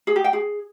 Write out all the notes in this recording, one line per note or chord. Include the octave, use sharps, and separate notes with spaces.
G#4
G4
G5
G#4